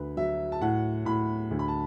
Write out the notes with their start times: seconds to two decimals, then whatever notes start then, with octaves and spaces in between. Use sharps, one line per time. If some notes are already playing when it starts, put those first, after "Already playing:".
Already playing: D2 B4
0.17 F#3 E5
0.52 A5
0.61 A2 F#5
1.05 A2 B5
1.51 D2
1.59 B5
1.68 A5